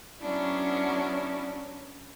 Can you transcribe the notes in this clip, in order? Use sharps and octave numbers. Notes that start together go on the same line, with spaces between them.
F#3 B3 C#4 D4 E4